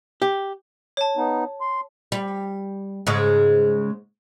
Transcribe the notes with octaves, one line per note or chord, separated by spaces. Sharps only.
G4
C#5 A5
B3 D#4
C6
G3
G#2 C#3 G#3